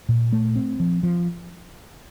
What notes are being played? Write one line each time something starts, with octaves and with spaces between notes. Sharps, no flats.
A#2
A3
C4
F3
F3